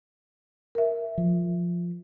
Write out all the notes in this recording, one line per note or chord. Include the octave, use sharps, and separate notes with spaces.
A#4 E5
F3